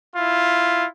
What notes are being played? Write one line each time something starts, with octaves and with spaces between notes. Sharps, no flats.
E4 F4